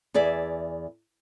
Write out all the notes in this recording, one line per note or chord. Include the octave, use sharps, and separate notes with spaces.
E2 G#4 D5 E5